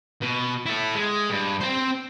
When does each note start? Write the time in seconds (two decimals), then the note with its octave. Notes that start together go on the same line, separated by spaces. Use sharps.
0.22 B2
0.66 E4 A4
0.95 G#3
1.30 G2
1.60 C4 C5